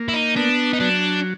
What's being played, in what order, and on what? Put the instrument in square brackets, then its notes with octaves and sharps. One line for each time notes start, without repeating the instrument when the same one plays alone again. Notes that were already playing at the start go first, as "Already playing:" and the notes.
Already playing: [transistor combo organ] A#3
[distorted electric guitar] E4
D#4
[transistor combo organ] B3 [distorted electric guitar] D4
[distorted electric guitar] D#4
[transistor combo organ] F#3 [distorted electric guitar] D4